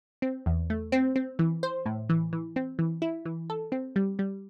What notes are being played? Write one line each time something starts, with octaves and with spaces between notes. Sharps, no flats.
C4
E2
A3
C4
C4
E3
C5
A2
E3
E3
C4
E3
E4
E3
A4
C4
G3
G3